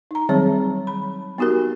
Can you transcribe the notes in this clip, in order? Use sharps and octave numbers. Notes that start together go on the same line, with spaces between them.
D#4 A#5
D#3 F#3 G3 C4 G#4 C#5
B5
B3 D#4 F#4 G4 A#4